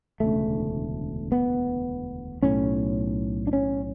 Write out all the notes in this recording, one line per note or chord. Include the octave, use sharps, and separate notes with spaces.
E1 D2 C#3 A3
B3
B1 A2 C#4
D4
C#4